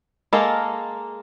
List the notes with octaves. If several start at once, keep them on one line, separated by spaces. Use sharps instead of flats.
G#3 A#3 A4 A#4